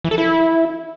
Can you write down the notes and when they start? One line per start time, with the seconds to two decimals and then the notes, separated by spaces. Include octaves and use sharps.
0.04 E3
0.11 A4
0.18 E4